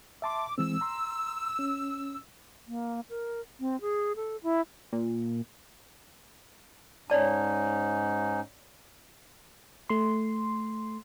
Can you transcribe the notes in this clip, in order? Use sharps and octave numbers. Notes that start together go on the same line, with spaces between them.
E5 A5 C6 D6
E3 G#3 C4 E6
A#5 C6
C#4
A#3
A#4
C4
G#4
A4
E4
A#2
G#2 C#4 D#4 C#5 D5 A5
A3 C6